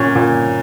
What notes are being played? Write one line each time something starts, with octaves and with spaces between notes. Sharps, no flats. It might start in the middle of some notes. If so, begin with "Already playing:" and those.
Already playing: A#2 C#4
A#2